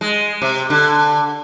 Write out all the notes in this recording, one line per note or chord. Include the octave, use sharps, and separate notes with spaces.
G#3
C3
D3